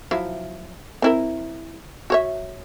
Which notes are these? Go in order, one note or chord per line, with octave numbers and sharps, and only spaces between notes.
F3 F#3 E4
C4 E4 A#4
F#4 C#5 E5